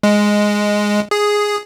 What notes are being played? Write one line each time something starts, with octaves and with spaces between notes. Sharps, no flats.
G#3
G#4